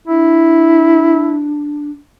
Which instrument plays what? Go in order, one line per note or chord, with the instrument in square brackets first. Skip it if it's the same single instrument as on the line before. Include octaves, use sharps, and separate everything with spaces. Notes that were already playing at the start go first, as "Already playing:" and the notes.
[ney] D4 [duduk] E4